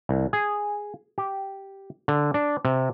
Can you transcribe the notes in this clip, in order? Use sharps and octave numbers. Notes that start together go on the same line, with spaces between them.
C2
G#4
G4
D3
D4
C3